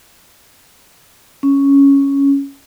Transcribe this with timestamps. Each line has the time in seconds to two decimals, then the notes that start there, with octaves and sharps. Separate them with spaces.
1.43 C#4